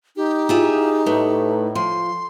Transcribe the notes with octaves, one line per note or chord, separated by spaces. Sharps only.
D#4 G4
E4 F4 G#4 E5
A2 A3 B4
F3 C6